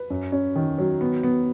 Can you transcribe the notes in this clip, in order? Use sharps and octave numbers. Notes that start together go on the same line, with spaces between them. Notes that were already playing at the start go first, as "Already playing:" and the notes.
Already playing: B4
F#2
C#4
D#3
F#3
B3
B3